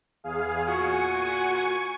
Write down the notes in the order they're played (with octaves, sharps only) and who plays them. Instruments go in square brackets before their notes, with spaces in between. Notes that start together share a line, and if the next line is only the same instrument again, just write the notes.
[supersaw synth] E2 G#4 F5
[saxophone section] A#2 F#4 [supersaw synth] G#5 C#6